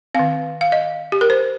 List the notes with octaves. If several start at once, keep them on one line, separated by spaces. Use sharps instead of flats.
D#3 C4 F5
F5
D#5
G4
A#4
C5